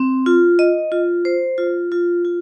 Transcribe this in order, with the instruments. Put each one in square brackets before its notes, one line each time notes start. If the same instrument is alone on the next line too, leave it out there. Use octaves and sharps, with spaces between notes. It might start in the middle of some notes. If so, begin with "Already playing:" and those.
Already playing: [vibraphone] C4
F4
D#5
F4
C5
F4
F4
F4